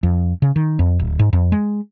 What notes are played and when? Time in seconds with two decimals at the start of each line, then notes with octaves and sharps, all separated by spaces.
0.03 F2
0.42 C#3
0.56 D#3
0.79 F2
0.99 D1
1.19 G#2
1.33 F2
1.52 G#3